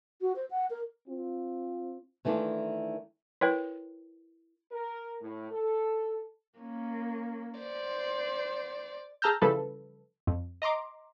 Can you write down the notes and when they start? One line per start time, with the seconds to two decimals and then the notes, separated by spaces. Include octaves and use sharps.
0.21 F#4
0.36 C5
0.51 F#5
0.70 A#4
1.09 C4 F4
2.25 D#3 E3 A3 D4 F4
3.41 E4 A#4 B4 C#5 G5
4.71 A#4
5.21 A2
5.51 A4
6.59 A#3 C#4
7.59 C5 D5
9.22 G#4 A5 A#5 E6 F6 G6
9.41 C#3 E3 F3 G3 A4 B4
10.27 F2
10.62 D#5 A#5 C6 D6